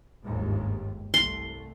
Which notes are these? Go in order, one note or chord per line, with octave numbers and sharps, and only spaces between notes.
G1 D#2 G#2
C2 A3 C6